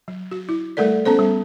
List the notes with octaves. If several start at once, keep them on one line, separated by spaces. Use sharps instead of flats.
F#3
F#4
E4
G3 A3 A4 A#4 D5
B3 C#4 A4 C5
G3